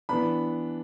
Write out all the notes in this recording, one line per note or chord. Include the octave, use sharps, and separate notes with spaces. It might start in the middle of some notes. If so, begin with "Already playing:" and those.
E3 B3 D4 B5